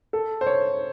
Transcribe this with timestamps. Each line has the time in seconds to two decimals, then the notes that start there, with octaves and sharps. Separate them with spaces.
0.13 A4
0.41 C5
0.47 C#5